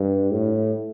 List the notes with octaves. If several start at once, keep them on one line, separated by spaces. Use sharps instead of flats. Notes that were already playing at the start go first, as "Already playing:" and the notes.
Already playing: G2
A2